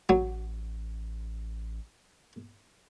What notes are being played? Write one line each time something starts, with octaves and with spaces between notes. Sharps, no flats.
A1 F#3